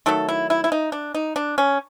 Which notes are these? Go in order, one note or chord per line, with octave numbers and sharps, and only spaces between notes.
D#3 F#3 A3 A4
E4
E4
E4
D#4
D4
D#4
D4
C#4